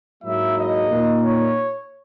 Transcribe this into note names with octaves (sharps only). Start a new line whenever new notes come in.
G#2 F#3 A#3 E4 E5
D#5
A#2 A#3 D#4
C#5